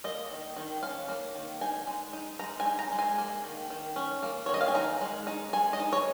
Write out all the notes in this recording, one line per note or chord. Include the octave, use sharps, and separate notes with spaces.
A#3 D#5
D#3
D#3
C#4 F5
A#3
D#3
D#4 G#5
G#3
D#4
G#3 A#5
G#5
D#4
A#5
G#3
G#5
A#3
D#3
D#3
C#4
A#3
D#3 C#5
D#5
F5
G#5
D#4 A#5
G#3
D#4
G#3 G#5
D#5
D#4
C#5